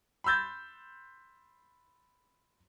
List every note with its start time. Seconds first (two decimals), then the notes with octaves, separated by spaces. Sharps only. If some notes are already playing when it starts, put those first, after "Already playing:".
0.24 B5 C6 E6 G6 A6